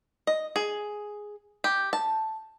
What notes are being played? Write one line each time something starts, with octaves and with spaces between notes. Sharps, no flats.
D#5
G#4
G4
A5